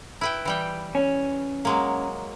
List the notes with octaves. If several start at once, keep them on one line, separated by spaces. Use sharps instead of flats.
E4 B4 G5
E3 G3 G5
C#4
F#3 G#3 A#3